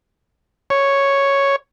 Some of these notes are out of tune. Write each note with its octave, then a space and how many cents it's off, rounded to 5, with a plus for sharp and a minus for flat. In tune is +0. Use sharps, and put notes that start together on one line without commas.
C#5 +0